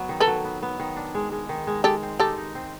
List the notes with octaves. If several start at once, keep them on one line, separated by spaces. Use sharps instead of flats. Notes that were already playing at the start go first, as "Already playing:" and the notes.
Already playing: F#3 B3
D#3
A4 B4
F#3
B3
B3
D#3
D4
G#3
G#3
D#3
G#3
G#3 G4 A4
C4
D#4 G4 A4
D#4
C4